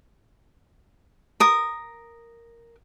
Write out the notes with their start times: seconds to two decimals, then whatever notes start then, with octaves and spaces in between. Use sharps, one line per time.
1.40 A#4 D#6